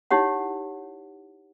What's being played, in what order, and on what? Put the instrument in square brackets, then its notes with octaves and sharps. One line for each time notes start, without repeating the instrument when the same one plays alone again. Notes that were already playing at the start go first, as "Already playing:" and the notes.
[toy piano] D#4 E4 G4 C#5 F#5